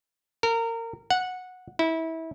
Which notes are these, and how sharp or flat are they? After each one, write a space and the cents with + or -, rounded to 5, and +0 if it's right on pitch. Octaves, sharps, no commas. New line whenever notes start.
A#4 -25
F#5 -10
E4 -25